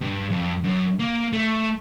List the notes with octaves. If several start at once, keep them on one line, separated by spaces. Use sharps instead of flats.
G2
F2
F#2
A#3
A3